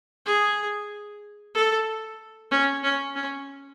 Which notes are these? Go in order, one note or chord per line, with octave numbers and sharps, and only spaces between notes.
G#4
A4
C#4
C#4
C#4